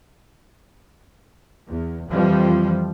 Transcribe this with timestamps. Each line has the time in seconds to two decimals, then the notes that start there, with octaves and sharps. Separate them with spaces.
1.68 E2
2.08 F2 E3 F3 G3